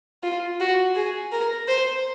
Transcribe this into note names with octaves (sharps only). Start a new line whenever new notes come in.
F4
F#4
G#4
A#4
C5